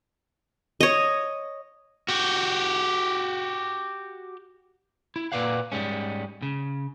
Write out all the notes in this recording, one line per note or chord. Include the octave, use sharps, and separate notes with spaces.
C#5 D#5
F#4 G4
E4
A#2 A#3 B4 D5 F5 F#5
G#2 G3 G#3 C#4
C#3